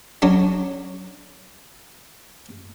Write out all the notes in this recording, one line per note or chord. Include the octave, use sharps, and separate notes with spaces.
F#3 C#4 D4